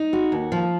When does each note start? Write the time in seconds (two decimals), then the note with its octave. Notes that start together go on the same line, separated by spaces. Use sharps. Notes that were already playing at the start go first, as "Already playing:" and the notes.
Already playing: D#4
0.13 F#4
0.32 D#2
0.52 F3